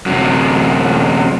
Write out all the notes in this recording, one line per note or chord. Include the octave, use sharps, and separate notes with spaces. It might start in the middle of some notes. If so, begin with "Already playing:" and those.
F#2 C3